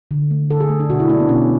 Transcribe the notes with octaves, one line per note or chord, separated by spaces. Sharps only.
D3
A3
D3 A4
G#4
A3
D4
B2 F#4
E4
F#3 A3 D4
B3
B2 C#4